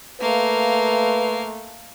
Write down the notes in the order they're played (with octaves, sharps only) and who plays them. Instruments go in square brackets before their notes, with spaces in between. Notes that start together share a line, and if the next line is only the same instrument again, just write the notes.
[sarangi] A3 [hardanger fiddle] A#3 F5 [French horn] B4